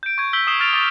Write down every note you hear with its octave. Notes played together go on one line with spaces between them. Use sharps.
G6 D7
C#6 G#6
E6 G6 B6 G7
D#6 C7 E7 G7
E6 F6 A6 D7 F7
C#6 D6 A6